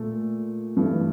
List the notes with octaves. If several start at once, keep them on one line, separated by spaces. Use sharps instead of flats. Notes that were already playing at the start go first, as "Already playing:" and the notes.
Already playing: A#2 A3
G2 E3 A3